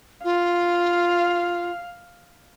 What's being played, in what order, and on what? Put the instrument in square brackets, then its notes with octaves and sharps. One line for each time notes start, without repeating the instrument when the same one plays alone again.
[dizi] F4 [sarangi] F5